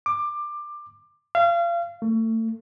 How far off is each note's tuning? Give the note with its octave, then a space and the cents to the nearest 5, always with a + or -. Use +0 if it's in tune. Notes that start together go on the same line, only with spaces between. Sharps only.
D6 +20
F5 -30
A3 +30